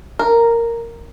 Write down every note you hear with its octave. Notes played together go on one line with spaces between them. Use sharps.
A#4